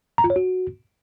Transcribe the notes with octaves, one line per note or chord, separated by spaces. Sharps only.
A#5
F4
C#5
F#4